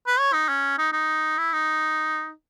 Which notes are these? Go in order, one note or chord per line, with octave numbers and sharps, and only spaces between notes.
B4
C#5
D#4
C#4
D#4
D#4
E4
D#4